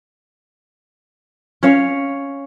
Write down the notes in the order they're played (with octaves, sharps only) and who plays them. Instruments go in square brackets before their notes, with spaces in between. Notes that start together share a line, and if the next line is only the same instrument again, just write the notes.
[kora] C#4 C#5 F5